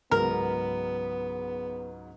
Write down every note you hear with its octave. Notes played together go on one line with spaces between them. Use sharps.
C#2 G#2 F#3 B3 A#4